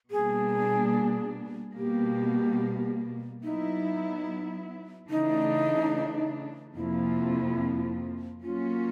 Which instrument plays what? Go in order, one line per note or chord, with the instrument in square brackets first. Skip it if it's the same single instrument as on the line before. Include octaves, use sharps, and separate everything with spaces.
[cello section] B2 G3 A#3 D4 [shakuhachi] G#4
[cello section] B2 G3 A#3 [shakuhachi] G4
[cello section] F#3 B3 E4 [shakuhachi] D#4
[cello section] C#3 E3 A3 D4 [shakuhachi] D#4
[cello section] F2 C3 F3 A#3 [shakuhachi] E4
[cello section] F#3 A#3 C#4 [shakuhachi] F4